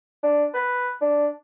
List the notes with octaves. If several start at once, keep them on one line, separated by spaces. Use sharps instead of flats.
D4
B4
D4